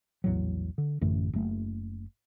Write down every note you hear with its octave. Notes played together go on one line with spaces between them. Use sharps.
A#1 E2 A2 F#3
D3
A1 F#2 D3 A3
F#1 A3